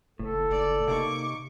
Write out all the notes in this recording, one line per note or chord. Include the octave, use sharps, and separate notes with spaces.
F#1 A2 A4
F#1 D5
C3 A#3 D#4 C#6 D6